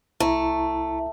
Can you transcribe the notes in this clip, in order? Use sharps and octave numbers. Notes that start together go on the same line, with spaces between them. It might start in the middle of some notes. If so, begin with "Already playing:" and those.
C2 A3 E4 A#5